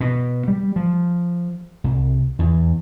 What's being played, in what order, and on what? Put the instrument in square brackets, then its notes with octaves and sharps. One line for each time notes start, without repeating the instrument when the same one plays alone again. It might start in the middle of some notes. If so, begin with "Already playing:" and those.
[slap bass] B2
G3
F3
C2
E2